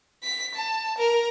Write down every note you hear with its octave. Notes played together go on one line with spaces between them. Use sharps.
B6
A5
A#4